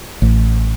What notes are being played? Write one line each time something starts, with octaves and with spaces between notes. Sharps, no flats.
A1